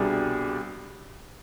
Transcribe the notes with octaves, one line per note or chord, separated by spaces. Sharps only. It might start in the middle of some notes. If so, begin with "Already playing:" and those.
Already playing: C2 B2 G3 D4 G#4